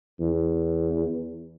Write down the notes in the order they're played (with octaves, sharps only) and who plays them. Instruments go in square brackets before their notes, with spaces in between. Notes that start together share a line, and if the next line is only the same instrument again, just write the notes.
[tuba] E2